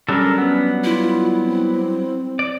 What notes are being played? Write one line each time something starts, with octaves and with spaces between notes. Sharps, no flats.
F#3 G3 C#4 D4 A4 A#4
B3
E4 F4
C4
D5